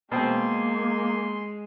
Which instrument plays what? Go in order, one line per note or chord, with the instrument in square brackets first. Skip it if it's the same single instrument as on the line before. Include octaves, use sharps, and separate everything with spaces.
[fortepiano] B2 C4 [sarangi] G#3 [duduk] A#3 [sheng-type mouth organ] C6